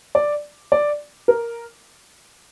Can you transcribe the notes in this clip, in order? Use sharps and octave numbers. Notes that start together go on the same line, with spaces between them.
D5
D5
A#4